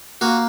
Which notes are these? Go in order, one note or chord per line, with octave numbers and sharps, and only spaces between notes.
A#3 F#4